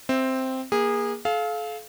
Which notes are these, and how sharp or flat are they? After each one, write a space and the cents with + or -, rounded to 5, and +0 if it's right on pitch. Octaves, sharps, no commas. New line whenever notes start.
C4 +0 E5 +0
A#3 +20 G#4 -20
A4 -40 F5 +0